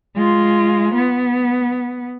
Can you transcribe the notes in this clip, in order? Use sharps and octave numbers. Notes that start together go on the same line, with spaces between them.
G#3 F4
B3